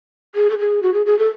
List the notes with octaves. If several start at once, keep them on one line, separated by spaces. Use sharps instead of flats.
G#4
A4
G#4
F#4
G#4
G#4
A4